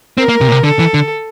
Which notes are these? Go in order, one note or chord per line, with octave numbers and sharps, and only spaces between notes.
C4 A#4
A#3
C3
A#2
C3
D3 A4
E3
D3